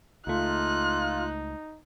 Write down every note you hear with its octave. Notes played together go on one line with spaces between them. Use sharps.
C#2 A3 D#4 F4 F#6